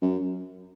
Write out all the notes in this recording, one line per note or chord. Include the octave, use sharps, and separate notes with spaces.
F#2